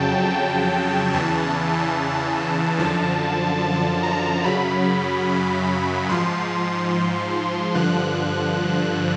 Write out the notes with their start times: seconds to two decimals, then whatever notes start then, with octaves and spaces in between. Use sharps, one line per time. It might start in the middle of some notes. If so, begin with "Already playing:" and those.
Already playing: F2 C#3 F#3 G5 A5
0.31 G5
1.14 E2 C#3 E3 A5
2.78 F#2 D3 F3 A5
3.62 A5
4.03 A#5
4.44 F#2 C#3 F#3 B5
6.09 G#2 F3 C6
7.74 G2 D3 F3 F#6